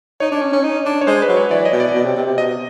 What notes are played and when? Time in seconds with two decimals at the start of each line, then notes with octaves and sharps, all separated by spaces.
0.20 D#4 C#5
0.31 D4
0.42 C#4
0.53 C#4
0.64 D#4
0.86 D4
1.01 C#5
1.07 G#3 C5
1.22 B4
1.29 F#3
1.37 C#5
1.50 E3 D5
1.65 D#5
1.72 B2
1.80 D5
1.94 B2
2.05 C3
2.16 C3
2.27 C3
2.38 B2 D#5